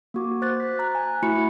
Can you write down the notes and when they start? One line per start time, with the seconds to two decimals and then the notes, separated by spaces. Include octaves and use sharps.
0.14 A#3 F#4 D6
0.42 C5 D6 F#6 A6
0.60 B6
0.79 A#5 F#6
0.95 G#5
1.22 A3 E4 F#4 B5 F#6 C#7